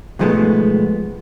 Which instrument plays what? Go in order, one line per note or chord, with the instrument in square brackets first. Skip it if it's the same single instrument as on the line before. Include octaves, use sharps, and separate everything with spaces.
[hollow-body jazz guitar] B1 G#2 F3 G#3 A3 B3